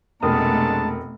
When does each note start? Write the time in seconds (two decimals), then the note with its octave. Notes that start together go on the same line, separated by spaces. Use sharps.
0.23 F1 B2 G#3 A3 D4 A#4 A5 D#6